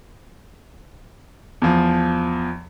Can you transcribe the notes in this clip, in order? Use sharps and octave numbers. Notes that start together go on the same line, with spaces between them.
E2 F3